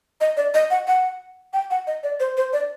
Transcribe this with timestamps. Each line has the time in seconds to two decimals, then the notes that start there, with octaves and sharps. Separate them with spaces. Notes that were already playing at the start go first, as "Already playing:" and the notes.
0.21 D#5
0.37 D5
0.54 D#5
0.71 F#5
0.87 F#5
1.53 G5
1.71 F#5
1.87 D#5
2.03 D5
2.20 C5
2.37 C5
2.53 D5